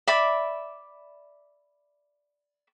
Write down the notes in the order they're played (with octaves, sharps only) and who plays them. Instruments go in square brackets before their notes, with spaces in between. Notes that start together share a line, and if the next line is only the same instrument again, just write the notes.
[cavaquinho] D5 E5 B5 D6